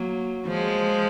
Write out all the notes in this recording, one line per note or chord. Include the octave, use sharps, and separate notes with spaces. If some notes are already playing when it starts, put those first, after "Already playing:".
Already playing: F#3 A#3
F3 G#3